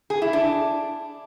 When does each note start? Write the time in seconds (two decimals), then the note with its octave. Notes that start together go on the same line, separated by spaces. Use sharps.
0.10 G#4
0.22 E4
0.33 D4